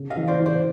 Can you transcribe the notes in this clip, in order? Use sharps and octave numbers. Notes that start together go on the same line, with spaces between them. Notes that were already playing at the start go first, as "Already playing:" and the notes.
Already playing: C#3
D#5 F5
E3
C5 D5
E3
C5 D5